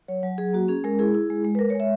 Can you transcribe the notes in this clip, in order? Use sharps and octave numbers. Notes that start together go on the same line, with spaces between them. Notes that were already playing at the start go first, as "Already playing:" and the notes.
F#3 C#5
F#3
F#3 G#4
A#3 F#4
C#4 G#4
G#3 A#4
E4 G#4
E4
G#3
G#3
B4
G#3 A#4
C#5
G#3 E5